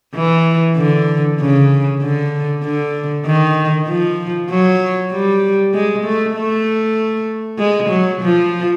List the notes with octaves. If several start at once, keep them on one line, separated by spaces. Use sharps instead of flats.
E3
D3
C#3
D3
D3
D#3
F3
F#3
G3
G#3
A3
A3
G#3
F#3
F3